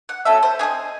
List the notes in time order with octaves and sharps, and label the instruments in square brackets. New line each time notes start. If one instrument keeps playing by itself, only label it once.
[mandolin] F#5
A3 C#4 F#4 A4 E5
C5
D#4 G#4 D#5
C4